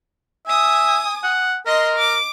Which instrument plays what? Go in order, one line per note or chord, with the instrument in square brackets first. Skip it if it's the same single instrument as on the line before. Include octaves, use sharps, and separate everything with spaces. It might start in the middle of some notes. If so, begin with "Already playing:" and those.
[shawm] E5 [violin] G#5 D#6
[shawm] F#5
[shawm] A#4 [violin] D#5 C6
[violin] D6